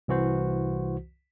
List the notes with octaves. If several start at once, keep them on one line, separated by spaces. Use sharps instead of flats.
C2 E3 F#4 C5